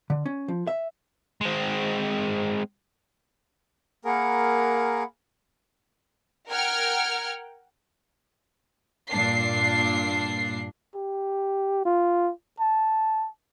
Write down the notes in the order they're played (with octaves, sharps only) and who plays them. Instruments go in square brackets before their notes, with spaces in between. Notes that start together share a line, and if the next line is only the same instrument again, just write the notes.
[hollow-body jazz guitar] D3
C#4
F3
E5
[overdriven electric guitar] G#3 C4
[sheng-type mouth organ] A#3 G#4 A#4 [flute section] F#5 B5
[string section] A#4 F#5 G5 F6 G#6
G2 A#2 D4 C7
[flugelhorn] G4
F4
A5